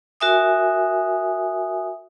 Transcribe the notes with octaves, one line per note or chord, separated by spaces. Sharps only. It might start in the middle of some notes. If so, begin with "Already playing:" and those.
F#4 A#4 E5 G#5 D#6